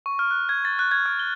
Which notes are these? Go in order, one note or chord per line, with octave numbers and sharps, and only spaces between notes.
C#6
F6
F#6
G#6
A6
F#6
G#6
F6
G7